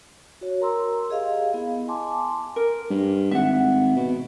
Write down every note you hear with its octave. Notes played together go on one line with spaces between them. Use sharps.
F#4 C#5
A#4 A#5 C6 E6
G4 G#4 D#5 F5
B3 E4
G#5 A5 C6 D6
A#4
G2
G#1 E5 F#5
B2